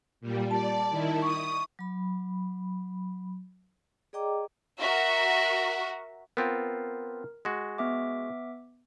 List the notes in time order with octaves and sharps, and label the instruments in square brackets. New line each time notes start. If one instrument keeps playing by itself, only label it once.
[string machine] A#2 G3
[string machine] D5 [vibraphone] A5
[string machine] D#3 E4
[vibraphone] C#6 [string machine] D#6
[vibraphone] F#3 B5
G#4 D5 D#5 G5 A#5 D6
[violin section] F#4 A#4 [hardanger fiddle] E5
[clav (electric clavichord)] B3 C4 F4 [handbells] A#4
[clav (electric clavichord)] G#3 F#4
[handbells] B3 E5 D6